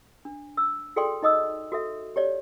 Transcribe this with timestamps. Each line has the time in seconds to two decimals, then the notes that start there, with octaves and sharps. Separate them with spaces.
0.25 D4
0.57 E6
0.96 F#4 G#4 A4 D5 G5 C6
1.23 D#4 D#5 D#6 E6
1.72 F#4 A4 E5
2.16 G4 C#5 D5